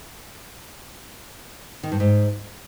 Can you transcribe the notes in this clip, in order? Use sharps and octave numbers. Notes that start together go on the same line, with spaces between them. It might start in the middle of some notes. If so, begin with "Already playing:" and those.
D#3
G2
G#2